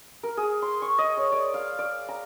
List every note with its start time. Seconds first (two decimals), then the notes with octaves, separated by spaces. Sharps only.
0.23 A#4
0.37 G#4
0.62 C6
0.82 C#6
0.98 D#5
1.17 C#5
1.32 D5
1.54 F5
1.79 D5
2.08 A#5